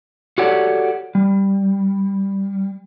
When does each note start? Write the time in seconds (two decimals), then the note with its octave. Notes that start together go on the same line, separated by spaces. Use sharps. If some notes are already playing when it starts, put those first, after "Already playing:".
0.38 F#4 G4 A4 C#5 D5 F#5
1.15 G3